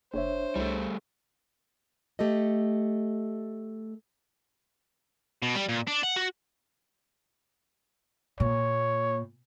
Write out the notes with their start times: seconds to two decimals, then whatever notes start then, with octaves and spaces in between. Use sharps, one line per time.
0.14 F#1 D4 C5 C#5 E5
0.56 C2 G3 A3
2.19 A3 G4 A4 D#5
5.42 B2
5.55 G3
5.69 A#2
5.87 D4
6.03 F#5
6.16 F#4
8.40 A#2 C#5